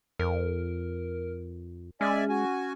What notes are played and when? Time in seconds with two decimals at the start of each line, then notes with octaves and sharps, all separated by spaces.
0.19 F2 A#4
2.01 G#3 C#4 D5 E5 G#5
2.29 F#4 G#5